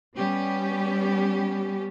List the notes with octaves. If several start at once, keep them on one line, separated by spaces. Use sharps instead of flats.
G3 B3 C#4 G4